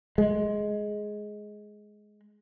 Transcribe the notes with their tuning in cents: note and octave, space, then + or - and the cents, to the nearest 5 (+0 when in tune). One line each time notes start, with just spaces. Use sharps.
G#3 +10